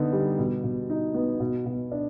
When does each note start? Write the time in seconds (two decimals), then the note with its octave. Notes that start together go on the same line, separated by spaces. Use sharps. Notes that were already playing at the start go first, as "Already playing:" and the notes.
Already playing: D3 B3 D#4
0.13 G3
0.38 B2
0.64 B2
0.90 D#4
1.14 B3
1.40 B2
1.66 B2
1.92 D4